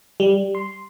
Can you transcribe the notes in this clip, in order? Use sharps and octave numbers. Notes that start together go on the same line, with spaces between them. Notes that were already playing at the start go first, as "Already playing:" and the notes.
G3
C6